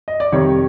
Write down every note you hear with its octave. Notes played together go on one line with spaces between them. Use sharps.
D#5
D5
F2 C3 D#3 G3 C#5